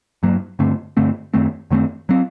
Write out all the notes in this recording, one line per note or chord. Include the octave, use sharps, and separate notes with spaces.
G2 F#3 A#3
G2 D3 A3 C4
G2 D3 A3 C4
F#2 D#3 A3 C4
F#2 D#3 A3 C4
F#3 C4